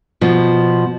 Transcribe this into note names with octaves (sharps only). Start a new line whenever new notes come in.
B2 F3